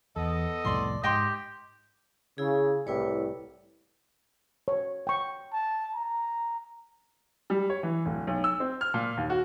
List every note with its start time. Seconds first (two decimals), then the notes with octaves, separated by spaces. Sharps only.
0.16 E2 B3 A4 D#5
0.65 C2 F2 A2 D5 C6
1.04 G#2 G4 D#5 G5 C6
2.38 C#3 E4 G#4
2.87 C2 A2 G3 E4 B4 C#5
4.68 C#5
5.07 G5 C#6
5.53 A5
5.95 A#5
7.50 G3
7.70 C#5
7.83 E3
8.06 D1
8.27 B1
8.44 E6
8.60 C4
8.81 F6
8.94 A#2
9.17 D#2
9.30 F#4